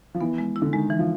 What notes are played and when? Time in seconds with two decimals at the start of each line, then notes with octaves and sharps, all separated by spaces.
0.15 F3
0.21 E3 B3
0.38 G#3
0.56 E4
0.62 D3
0.73 D#3 G#3
0.90 E3
0.99 F3